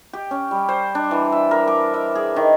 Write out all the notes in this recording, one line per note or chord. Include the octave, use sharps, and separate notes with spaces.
G4
C#4
G3
C5
D4
E3
E5
A#4
D6
E5
G#4
D#3